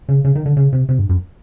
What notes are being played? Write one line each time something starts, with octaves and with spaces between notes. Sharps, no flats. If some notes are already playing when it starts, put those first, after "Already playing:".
C#3
C#3
D#3
D3
C#3
C3
C3
G2
F#2